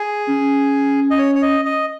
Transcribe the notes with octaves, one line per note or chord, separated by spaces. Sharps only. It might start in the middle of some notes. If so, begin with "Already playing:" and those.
Already playing: G#4
C#4
D#5
C#5
C#5
D#5
D#5